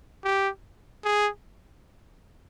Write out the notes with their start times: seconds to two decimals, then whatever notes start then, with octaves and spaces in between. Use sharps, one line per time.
0.24 G4
1.04 G#4